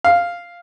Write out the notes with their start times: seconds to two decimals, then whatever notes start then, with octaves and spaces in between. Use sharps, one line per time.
0.05 F5